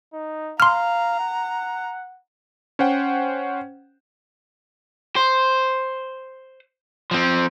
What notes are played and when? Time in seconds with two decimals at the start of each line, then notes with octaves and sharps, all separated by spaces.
0.13 D#4
0.60 F5 A#5 C6 F6
1.20 F#5
2.79 C#4 C5 F#5 G5
5.16 C5
7.11 F3 C4